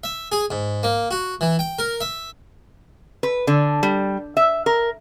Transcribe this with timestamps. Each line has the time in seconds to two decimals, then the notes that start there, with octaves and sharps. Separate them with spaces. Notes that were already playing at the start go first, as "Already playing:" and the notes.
0.04 E5
0.32 G#4
0.51 G#2
0.83 A#3
1.11 F#4
1.41 E3
1.59 G5
1.79 A#4
2.01 E5
3.23 B4
3.47 D3
3.83 G3
4.37 E5
4.66 A#4